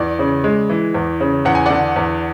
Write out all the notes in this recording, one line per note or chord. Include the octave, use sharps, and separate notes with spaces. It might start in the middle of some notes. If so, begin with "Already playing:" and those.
Already playing: E2 D5
C#3
G#3
E3
E2
C#3
E2 F#5
G#5
D3 D5 F#5
E2